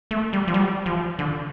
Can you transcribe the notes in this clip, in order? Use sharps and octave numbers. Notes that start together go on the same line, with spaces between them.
A3
G3
F3
G3
F3
D3